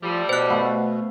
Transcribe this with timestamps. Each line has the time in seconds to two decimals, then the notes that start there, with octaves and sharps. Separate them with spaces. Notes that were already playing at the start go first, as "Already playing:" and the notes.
0.03 A2 F3 G3
0.29 B2 C5 F#6
0.50 A3 B3 F5